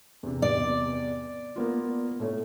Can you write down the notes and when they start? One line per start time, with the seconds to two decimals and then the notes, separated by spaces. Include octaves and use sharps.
0.23 E2 C3
0.42 D5
1.56 A#3 B3 F4
2.20 A2 A3 C#5